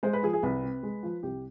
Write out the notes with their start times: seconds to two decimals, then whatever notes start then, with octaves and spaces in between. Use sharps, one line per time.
0.03 G#3 C5
0.13 B4
0.23 F3 G#4
0.33 G#4
0.43 C2 B4
0.63 C3
0.83 G#3
1.03 F3
1.23 C2 G4